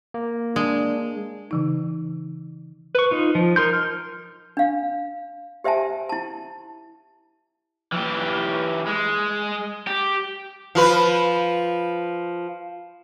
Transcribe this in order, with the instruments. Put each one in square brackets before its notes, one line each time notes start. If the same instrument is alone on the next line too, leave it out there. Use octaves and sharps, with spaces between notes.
[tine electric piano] A#3
[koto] G#3 [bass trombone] D4
[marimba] C#3 E3 D#4
[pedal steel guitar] B4 C#6
D#4 F4
F3
D#4 A#4 C6 G6
F6
[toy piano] D4 F5
G4 C5 E5 G#5 A5
E4 A5
[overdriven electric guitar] E3 G4
G#3
G4
[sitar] F3 F4 B4